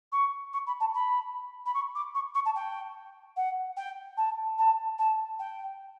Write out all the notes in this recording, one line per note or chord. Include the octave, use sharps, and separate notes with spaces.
C#6
C#6
B5
A5
B5
B5
C#6
D6
C#6
C#6
A5
G5
F#5
G5
A5
A5
A5
G5